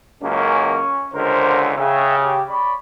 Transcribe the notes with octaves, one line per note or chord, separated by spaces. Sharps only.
C#2 F#2 A#3 C#4
C#2 D3 A#4 C5
C#3 E5 G5
G4
C#5 D5 B5